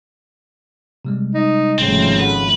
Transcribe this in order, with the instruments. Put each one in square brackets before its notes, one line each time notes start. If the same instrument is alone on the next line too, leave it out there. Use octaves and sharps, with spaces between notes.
[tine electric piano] C3 G3 G#3
[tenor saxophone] D#4
[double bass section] G#1 F3 A3 [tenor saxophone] C#3 [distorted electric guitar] C4
[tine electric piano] A4 C#5 F#5 [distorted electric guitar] B4